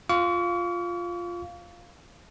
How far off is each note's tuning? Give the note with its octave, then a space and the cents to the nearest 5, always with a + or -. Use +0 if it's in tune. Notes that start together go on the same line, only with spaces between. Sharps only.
F4 +0 F5 +0 C#6 +40